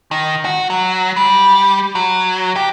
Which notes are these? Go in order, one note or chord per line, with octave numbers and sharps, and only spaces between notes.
D#3
F#4
F#3
G3
F#3
G4